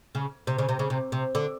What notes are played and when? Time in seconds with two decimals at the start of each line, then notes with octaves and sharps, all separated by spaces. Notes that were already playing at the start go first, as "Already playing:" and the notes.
0.15 C#3
0.47 C3
0.58 C#3
0.69 C3
0.79 C#3
0.90 C3
1.12 C3
1.35 D3